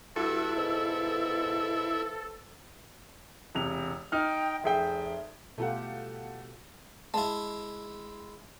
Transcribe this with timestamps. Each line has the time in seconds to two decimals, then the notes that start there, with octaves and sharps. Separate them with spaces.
0.16 G2 E4 F#4 A4
0.56 G#2 B2 F4 B4 C5
3.55 E1 C3 F7
4.12 D#4 G5 F6
4.64 F1 G#4 E5 G5
5.58 B2 A3 F4 G4 A4 F#5
7.14 G#3 E4 A5